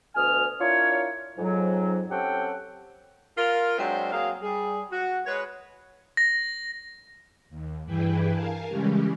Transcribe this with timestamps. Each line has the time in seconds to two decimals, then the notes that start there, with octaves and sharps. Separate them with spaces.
0.15 D2 B2 G#5 D#6 F6
0.59 D4 E4 F4 A#4 C#5
1.38 F2 G#2 F#3
2.10 C4 C#4 G4 A4 F#5 G5
3.38 F4 A#4
3.79 F#3 G#3 C4 D4 C5 E5
4.12 F#3 A#3 C4 G#4 F5
4.42 G3 G#4
4.92 F#4
5.26 G#3 B4 C#5
6.17 A#6
7.50 D#2
7.85 G2 E3 E4 G#4 B4 G5
8.30 A#4 F5 G#5 A5
8.69 C#3 E3 G3 G#3 C#4 G4